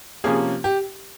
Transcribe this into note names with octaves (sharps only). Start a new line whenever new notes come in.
C3 F3 A#3 C#4 G#4
G4